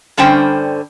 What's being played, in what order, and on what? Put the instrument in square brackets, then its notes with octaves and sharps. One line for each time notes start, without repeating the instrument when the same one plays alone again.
[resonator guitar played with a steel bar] G2 D3 G3 C#4 C5 G5